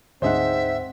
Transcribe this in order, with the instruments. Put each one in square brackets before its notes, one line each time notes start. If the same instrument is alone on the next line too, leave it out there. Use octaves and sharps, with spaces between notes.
[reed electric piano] D2 G#2 F#5 [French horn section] C4 [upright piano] D#4 G#4 C5 [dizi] E5